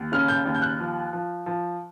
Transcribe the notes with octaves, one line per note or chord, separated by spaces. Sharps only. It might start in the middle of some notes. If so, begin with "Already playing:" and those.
Already playing: D#2
C#3 F6
G6
D#2
G6
F#6
F3
F3
F3